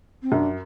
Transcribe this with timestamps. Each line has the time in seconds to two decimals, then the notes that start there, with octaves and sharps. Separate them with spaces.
0.23 C4
0.32 F#2 D4